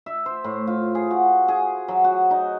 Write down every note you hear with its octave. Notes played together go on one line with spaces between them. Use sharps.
E5
C5
A2
F4
G#4
F#4
G#4
F#3
F#4
D#4